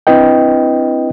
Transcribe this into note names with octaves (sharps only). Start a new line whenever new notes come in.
C4 D4 E4 B4 D#5 G5